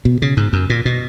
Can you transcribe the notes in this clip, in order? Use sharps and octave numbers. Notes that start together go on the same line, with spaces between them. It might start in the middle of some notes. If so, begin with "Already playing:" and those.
B2
C#3
G#2
F#2
A#2
B2